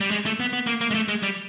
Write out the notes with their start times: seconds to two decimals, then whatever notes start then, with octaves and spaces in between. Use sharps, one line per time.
0.01 G3
0.11 G#3
0.26 A3
0.40 B3
0.53 B3
0.67 A#3
0.81 A#3
0.91 G#3
0.94 A3
1.08 G#3
1.23 G3